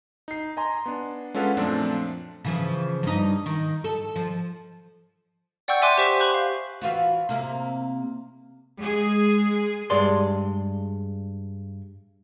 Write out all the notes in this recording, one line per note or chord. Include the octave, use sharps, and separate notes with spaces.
D#4 C7
D#5 G#5 A#5 C6
B3 D4
G#3 C#4 F4 A4 B4 F#5
F#2 A#2 F3 A3 C4 D4
C#3 E3 F3
G2 D#4
D#3
A4
F3
D5 F#5 G5 C#6 E6 G6
E5 G5 G#5 C6 D6 F#6
G4 C5 C#6 B6 E7
B5 C#6 F#6 G6
F5
E3 F4 F#4
C3 A#3 E4
G#3 G#4
G2 G#3 G#4 D5 C6